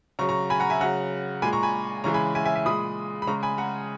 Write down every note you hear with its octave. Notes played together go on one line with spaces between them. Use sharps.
C#3 F#3 A#5 C#6
A#5 C#6
G#5 B5
F#5 A#5
E5 G#5
C#3 F#3 F#5 A#5
A#2 G#3 G#5 B5
A#5 C#6
G#5 B5
C#3 E3 G#3 A#5 C#6
G#5 B5
E5 G#5
E5 G#5
E5 G#5
A#2 G#3 B5 D#6
B5
C#3 G#3 A#5 C#6
G#5 B5
F#5 A#5